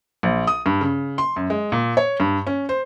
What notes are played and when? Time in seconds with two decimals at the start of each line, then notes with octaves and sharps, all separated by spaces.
0.23 A#1
0.47 D#6
0.66 G2
0.81 C#3
1.18 C6
1.36 F#2
1.50 G#3
1.72 A#2
1.97 C#5
2.20 G2
2.47 C#4
2.69 C5